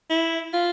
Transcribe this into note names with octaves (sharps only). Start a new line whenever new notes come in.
E4
F4